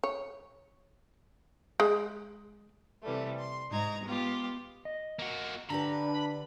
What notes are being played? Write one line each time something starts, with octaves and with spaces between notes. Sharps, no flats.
C#5
G#3
C3 E3 G3 A3
C6
G#2 D#4 A#5 G#6
G#3 B3 F4 G4
D#5
A#3 F#4
D3 D4 G4 B4 A#5 B5